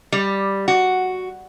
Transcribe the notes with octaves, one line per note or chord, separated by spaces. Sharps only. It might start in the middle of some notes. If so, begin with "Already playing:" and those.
G3
F#4